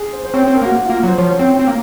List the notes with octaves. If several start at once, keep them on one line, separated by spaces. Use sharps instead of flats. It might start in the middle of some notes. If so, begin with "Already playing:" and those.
Already playing: G#4
C5
C5
C4 C#5
C5
C4
A#4
A#3 F#4
F#4
F4
A#3
F#3 C5
F3 C#5
C#5
C4 C#5
C4
A#3